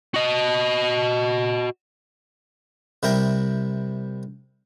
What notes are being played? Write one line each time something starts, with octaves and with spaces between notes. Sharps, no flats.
F#4 D#5
C3 G3 E4 A#4 G5